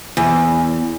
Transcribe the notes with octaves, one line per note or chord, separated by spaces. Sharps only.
E2